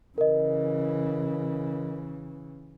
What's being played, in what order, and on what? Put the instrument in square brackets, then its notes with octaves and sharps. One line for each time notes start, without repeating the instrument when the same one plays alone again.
[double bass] C#3 E3 [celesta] A#4 D#5